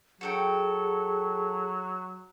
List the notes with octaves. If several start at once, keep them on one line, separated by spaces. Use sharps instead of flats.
F#3 F#4 G#4 A4 G5